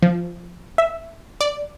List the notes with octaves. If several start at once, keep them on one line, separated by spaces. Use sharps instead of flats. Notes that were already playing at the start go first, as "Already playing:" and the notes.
F3
E5
D5